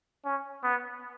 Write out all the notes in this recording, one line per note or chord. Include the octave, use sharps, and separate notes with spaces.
C#4
B3